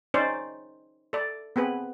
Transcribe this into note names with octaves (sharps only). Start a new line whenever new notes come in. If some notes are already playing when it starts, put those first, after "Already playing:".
C#4 D#4 C5 D5
A4 D5
B3 C4 G#4 B4